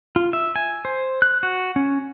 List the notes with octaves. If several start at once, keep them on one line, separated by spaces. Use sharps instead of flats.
F4
E5
G#5
C5
F#6
F#4
C#4